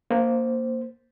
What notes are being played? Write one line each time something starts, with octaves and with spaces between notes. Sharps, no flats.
A#3 C5